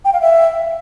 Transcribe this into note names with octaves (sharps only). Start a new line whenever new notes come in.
G5
F5
E5